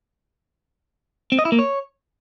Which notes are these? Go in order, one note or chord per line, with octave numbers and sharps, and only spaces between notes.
C4
D#5
E4
A#3
C#5